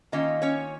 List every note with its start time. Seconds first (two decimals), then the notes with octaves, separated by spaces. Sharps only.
0.12 D#3 A#3 C#4 F4 D#5
0.42 C#4 C#5